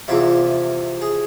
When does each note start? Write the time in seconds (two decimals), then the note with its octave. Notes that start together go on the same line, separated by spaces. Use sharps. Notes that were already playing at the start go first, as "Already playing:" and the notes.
0.08 E2 C3 F3 E4
1.01 G#4